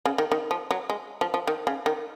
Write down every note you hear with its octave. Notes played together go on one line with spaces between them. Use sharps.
C#3
D#3
D#3
F3
F#3
G#3
F3
F3
D#3
C#3
D#3